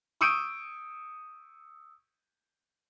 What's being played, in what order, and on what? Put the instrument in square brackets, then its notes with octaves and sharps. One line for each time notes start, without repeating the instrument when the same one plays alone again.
[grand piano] C#6 D#6 E6 G6 D7 D#7